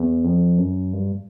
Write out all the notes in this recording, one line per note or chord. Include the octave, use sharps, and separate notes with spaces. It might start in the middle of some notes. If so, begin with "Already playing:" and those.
Already playing: E2
F2
F#2
G2